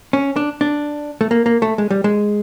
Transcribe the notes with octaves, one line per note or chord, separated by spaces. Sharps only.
C#4
D4
D4
A3
A#3
A#3
A3
G#3
G3
G#3